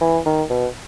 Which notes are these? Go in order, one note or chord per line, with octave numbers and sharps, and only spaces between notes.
E3
D#3
B2